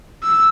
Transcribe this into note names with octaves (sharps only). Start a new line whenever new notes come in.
E6